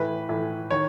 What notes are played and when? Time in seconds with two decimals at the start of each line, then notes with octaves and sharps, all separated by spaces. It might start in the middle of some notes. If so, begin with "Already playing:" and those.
Already playing: A2 E3 B4
0.29 A2 E3
0.71 D#3 C#5